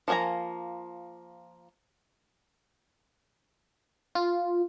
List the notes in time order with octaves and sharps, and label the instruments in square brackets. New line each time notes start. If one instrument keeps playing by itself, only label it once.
[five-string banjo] F3 A#3 G#4 G#5 A#5
[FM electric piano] F4